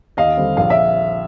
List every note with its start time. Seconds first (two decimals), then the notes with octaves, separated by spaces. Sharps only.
0.17 D#2 D#5 F5
0.37 D3 G3 C4
0.57 A#1 F5
0.70 E5